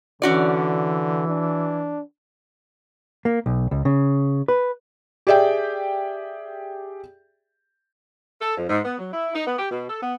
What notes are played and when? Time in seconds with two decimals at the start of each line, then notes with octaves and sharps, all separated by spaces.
0.22 D3 E3 C#4 F#4 D5
1.27 D4
3.25 A#3
3.46 B1
3.71 C#2
3.85 C#3
4.48 B4
5.27 G4 G#4 D5 E5 G5
8.42 A4
8.58 F2
8.70 G#2
8.85 B3
8.99 F#3
9.13 E4
9.35 D#4
9.47 B3
9.59 G4
9.71 B2
9.90 A4
10.03 B3